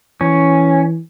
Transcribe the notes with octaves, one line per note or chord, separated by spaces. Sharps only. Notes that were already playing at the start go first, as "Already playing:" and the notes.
E3 C#4